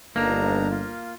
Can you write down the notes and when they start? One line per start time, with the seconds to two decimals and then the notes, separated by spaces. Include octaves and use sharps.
0.16 G1 A#3 D4 D#4 A#5
0.71 F4